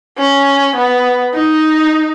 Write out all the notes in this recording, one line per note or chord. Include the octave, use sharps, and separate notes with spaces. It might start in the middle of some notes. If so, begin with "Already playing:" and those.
C#4
B3
D#4